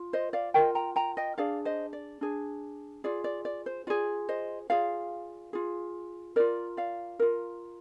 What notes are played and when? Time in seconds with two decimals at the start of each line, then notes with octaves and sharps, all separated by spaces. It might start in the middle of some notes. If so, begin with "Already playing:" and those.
Already playing: F4
0.13 C5 D#5
0.33 D5 F5
0.54 F4 A#4 D#5 G5
0.75 G5 A#5
0.96 G5 A#5
1.17 D#5 G5
1.38 D4 G#4 D5 F5
1.65 C5 D#5
1.93 D5
2.21 D4 G#4
3.04 F4 G#4 D5
3.24 D5
3.45 D5
3.66 C5
3.87 F4 G#4 D5
4.29 C5 D#5
4.70 F4 G#4 D5 F5
5.53 F4 G#4
6.36 F4 A#4 D5
6.77 D5 F5
7.19 F4 A#4